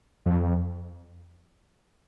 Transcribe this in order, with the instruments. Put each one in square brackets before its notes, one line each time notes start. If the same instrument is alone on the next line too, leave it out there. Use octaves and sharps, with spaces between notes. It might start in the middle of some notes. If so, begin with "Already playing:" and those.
[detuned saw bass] F2